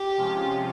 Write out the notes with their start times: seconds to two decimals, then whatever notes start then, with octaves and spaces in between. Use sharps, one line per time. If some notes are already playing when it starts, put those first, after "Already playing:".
Already playing: G4
0.17 C3 F3 G#3 C#4 F4